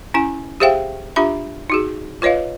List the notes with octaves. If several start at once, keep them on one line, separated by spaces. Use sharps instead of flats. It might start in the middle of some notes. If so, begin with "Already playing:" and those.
C#4 E4 G#5
G4 G#4 C5 E5 F5 G5
D4 F4 G4 E5 B5
D#4 F#4 G#4
F4 B4 C#5 D#5 F5